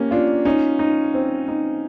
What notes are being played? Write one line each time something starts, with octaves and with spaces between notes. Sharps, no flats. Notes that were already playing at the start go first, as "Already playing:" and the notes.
Already playing: A#3 C#4 G4
D4 F4
C#4 D#4
D#4
C4
D#4